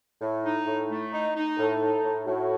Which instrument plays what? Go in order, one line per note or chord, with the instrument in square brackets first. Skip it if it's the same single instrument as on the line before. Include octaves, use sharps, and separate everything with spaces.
[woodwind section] A2
D#4
A2
A3
D#4
D#4
[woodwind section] A2 [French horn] A4
[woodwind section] D#4
A2
[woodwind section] A2 [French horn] F#4